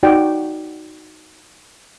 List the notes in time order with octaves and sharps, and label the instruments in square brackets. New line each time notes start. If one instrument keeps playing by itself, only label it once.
[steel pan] D#4 F#4 D5 G5